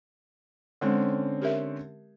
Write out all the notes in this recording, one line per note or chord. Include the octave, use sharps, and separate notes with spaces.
D3 G#3 C4 C#4
G4 A#4 E5